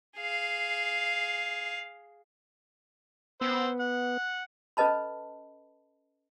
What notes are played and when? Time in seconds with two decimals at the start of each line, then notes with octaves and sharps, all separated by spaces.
0.17 G#4 F5
3.41 B3 C5 E6
3.80 F#5
4.77 C#4 A4 B4 D#5 A5 B5